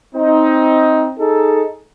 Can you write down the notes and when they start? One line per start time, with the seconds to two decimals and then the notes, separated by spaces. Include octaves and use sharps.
0.15 C4 D#4
1.19 D#4 G#4 A4